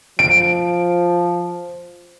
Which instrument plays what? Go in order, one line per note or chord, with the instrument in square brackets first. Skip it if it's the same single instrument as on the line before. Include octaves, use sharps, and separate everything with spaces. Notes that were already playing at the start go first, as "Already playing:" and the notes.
[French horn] F3 [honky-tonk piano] D7